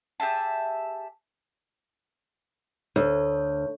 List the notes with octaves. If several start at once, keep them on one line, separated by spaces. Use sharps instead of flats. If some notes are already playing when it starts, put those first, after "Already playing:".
G4 G#4 E5 A5
D2 C#5